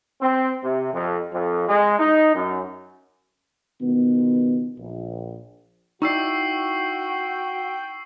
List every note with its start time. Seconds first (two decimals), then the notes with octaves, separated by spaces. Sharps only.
0.20 C4
0.63 C3
0.93 F2
1.33 F2
1.68 G#3
1.98 D#4
2.35 F#2
3.81 C#2 B2 D#3 B3
4.79 A#1
6.02 D#4 E4 F#4 D5 G5 C#6 E6 C7